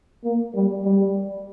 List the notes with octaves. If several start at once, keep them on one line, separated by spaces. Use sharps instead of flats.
A#3
G3
G3